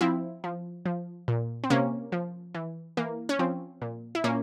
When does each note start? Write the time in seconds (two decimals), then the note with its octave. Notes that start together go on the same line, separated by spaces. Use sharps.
0.01 F3 C4 E4
0.44 F3
0.86 F3
1.28 A#2
1.64 C4
1.70 C3 A#3 C#4
2.12 F3
2.55 E3
2.97 E3 A#3
3.29 C#4
3.39 F3 C4
3.82 A#2
4.15 E4
4.24 A#2 A#3 C#4